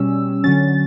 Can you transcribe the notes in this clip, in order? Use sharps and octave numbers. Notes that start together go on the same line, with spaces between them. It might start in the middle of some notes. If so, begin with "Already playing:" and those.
Already playing: B2 G3 C#4 E6
D3 F#3 C#4 A6